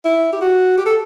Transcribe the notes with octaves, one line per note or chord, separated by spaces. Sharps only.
E4
G4
F#4
G4
A4